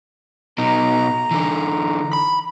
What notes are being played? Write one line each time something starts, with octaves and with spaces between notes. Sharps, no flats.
B2 D#4 A#5
D3 E3
B5